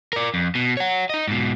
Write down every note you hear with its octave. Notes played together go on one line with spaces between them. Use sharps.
A#4 D5
F2
B2
C#5 F#5
D#4 D#5
G#2 B2